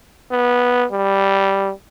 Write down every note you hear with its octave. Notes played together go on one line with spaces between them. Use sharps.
B3
G3